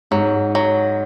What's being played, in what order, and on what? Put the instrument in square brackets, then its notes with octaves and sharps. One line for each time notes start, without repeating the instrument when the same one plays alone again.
[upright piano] G#2 [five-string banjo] F#3
[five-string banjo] F#3